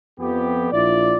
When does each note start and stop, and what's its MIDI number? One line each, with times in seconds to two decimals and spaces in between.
0.19 0.71 41
0.19 0.71 59
0.19 0.71 67
0.72 1.18 34
0.72 1.18 64
0.72 1.18 65
0.72 1.18 74